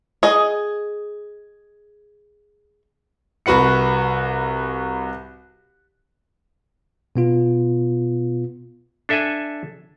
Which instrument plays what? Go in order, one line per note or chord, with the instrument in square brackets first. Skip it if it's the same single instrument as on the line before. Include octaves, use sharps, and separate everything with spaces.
[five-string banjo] G#4 D#5
[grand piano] C2 F#4 B4 F#5 C#7
[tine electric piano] B2 B3 F4
[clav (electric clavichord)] D4 A4 E5 F#5 G#5